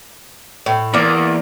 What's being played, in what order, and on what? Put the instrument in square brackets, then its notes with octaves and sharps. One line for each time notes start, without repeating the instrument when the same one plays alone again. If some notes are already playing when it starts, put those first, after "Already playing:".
[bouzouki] A2
[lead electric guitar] E2 [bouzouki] A#3 D5